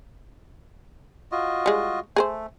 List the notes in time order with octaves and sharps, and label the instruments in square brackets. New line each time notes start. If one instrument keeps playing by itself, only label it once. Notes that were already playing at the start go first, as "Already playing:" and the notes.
[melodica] F4 F#4 D#5
[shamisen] G3 G#3
[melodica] A3 [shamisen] G#4 A#4 C5